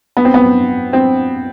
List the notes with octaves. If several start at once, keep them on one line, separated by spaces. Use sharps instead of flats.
B3
C4
B3
C4